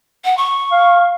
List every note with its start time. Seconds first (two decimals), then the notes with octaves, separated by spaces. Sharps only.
0.25 F#5
0.37 C#6
0.71 F5